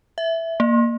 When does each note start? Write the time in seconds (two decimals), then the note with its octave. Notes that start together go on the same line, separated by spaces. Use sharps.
0.18 E5
0.60 A#3